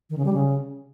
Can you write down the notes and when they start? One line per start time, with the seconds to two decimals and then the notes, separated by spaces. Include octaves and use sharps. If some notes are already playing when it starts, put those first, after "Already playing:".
0.10 D#3
0.18 C#3
0.25 G3
0.33 C#3